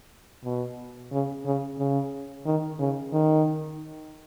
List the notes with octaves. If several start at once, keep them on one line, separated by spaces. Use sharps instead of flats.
B2
C#3
C#3
C#3
D#3
C#3
D#3